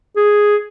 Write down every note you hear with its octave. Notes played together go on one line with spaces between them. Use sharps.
G#4